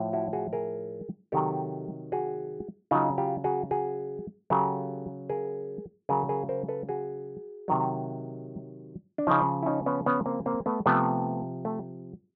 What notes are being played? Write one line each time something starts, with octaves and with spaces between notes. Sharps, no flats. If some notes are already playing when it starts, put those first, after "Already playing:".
Already playing: A2 F3
E4 F#4
F#4 G#4
G#4 A#4
C3 D#3 F#3 G4 A4
F#4 G#4
C#3 F#3 D#4 F4
F4 G4
F#4 G#4
F#4 G#4
C#3 F#3 G4 A4
G#4 A#4
C#3 F#3 G#4 A#4
G#4 A#4
A#4 C5
A4 B4
F#4 G#4
C3 D#3 F#3
D4
C#3 F3 C#4 D#4
E4
C#4 D#4
B3 C#4
B3 C#4
A#3 C4
A#3 C4
A3 B3
C3 F3 A3 B3
A3